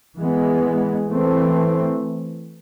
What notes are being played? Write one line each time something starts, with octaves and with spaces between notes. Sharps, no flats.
E3 G#3 B3
E3 A3 C4